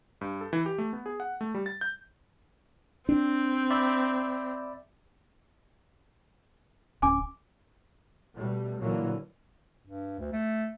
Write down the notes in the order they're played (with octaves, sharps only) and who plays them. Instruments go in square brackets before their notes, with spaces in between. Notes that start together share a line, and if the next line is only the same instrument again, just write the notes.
[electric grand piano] G2
A4
E3
G4
A3
B3
G#4
F#5
A3
G3
A6
G6
[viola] C4 [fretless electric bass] D4
[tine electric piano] D5 E5 B5
[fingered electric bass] D1 C#4 [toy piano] G#5 D6
[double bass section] B2 G3 A3
A#2 D3 E3 F#3 A#3
[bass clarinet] G2
D2
A3